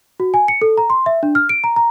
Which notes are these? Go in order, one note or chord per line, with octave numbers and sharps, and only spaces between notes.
F#4
G#5
C#7
A4
A#5
C6
E5
D4
F6
D7
A#5
A#5